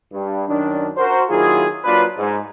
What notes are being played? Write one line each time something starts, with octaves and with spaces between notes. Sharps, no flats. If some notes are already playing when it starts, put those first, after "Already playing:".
G2
F#2 D#3 F#3 D4
F#4 A#4 C5
D#3 F#3 A#3 E4 F4 G#4
F#3 A#3 D4 F4 B4
G#2